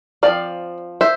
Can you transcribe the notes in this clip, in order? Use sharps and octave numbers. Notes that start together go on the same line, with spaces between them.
F3 C4 D5 F5
C5 E5